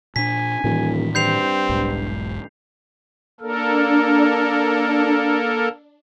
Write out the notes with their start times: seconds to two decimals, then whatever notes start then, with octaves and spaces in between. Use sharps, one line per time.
0.16 A#2 D4 G#5 B6
0.64 D#1 A2 D#3 E3
1.15 G2 C4 G6 C7 F7
1.69 E1 B1 G#2
3.40 A#3 D4 A4 A#4